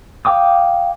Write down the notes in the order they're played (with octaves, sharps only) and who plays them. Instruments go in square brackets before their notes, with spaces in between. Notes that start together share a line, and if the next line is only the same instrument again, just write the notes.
[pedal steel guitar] F5 G5 D6 D#6